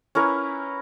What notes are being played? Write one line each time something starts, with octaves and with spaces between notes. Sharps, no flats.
C#4 E4 A#4 B4